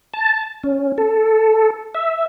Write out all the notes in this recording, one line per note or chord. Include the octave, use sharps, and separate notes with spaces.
A5
C#4
A4
E5